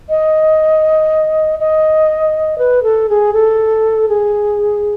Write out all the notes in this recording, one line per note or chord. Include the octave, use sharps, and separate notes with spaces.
D#5
D#5
B4
A4
G#4
A4
G#4